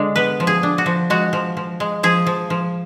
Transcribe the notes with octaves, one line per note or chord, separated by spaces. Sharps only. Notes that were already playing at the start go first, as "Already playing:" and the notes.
Already playing: D3 G#3 D4
B3 B4
F3
G#4
D4
F#4
F3
G#3 F#4
F3
F3
G#3
F3 G#4
F3
F3